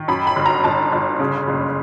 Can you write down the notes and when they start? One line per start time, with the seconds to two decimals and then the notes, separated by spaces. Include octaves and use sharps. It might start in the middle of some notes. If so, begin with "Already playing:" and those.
Already playing: D#3
0.08 F#2 B5
0.27 B5
0.36 G1
0.46 A#5
0.64 G1 A5
0.92 G1
1.19 C#3
1.48 F#1